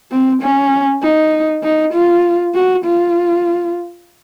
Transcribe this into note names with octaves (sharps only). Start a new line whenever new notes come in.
C4
C#4
D#4
D#4
F4
F#4
F4